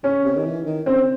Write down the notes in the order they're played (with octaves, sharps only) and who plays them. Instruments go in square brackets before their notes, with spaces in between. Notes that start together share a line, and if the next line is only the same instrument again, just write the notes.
[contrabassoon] C#3 [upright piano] C#4
[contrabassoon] C3
D#3
E3
D#3
[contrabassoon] C#3 [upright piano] C4